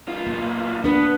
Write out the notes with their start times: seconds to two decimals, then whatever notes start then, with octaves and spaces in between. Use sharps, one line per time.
0.08 B1 F4
0.27 A#3
0.84 B3 D4 B4